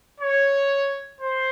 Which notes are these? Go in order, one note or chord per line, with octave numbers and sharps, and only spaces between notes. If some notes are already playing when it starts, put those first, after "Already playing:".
C#5
C5